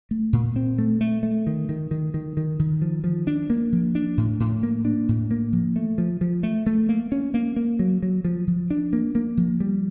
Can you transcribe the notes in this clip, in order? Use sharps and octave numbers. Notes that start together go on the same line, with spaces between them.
A3
A#2
C4
A3
A3
A3
D#3
D#3
D#3
D#3
D#3
D#3
F3
F3
D4
A#3
F3
D4
A2
A2
A#3
D4
A2
A#3
F3
A3
F3
F3
A3
A3
A#3
C#4
A#3
A#3
F#3
F#3
F3
F3
D4
A#3
A#3
F3
G3